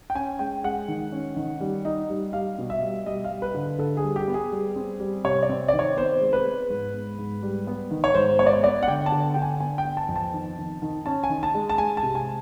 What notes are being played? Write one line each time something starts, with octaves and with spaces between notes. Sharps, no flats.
G5
C#4 G#5
G#3 G5
G#3 F#5
D#3
C#4
D#3
G3
D#4
G3
G3 F5
B2
E5
G3
G3 D#5
F5
G3
B4
D3
D3 A4
G#4
G3
G4
B3
G#4
G3
C4
G3
C3 C#5
D5
C4
D#3 D5
C#5
B3 C5
G#3
B4
G#3
G#2
B3
G#2
G3
B3
D#3
C#5
G#2 C5
B3 C#5
D5
C#5
B3 D5
F#5
D3 G5
A5
D3
D3 G5
G#5
B3 G#5
G5
B3
A5
F2
A5
D#3
D#3
D#3
C#4 A5
G#5
D#3
A5
G#3
A5
G#3 G#5
A5
C3
G#5